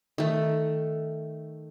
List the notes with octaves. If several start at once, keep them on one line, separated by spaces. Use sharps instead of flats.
D#3 A3